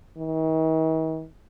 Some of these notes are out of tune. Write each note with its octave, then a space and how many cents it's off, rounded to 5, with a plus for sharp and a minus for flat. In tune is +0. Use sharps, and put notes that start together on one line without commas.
D#3 +45